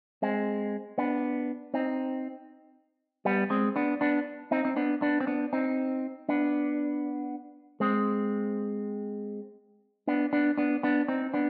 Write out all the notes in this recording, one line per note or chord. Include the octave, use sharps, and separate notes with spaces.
G#3 C4
B3 D4
C4 D#4
G3 B3
G#3 C4
B3 D4
B3 D4
C4 D#4
C4
B3 D4
B3 D4
C4
B3 D4
C4 D#4
B3 D4
G#3 C4
B3 D4
B3 D4
B3 D4
B3 D4
C4 D#4
B3 D4